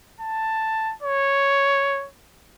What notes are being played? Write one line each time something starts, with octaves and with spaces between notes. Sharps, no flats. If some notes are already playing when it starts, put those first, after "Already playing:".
A5
C#5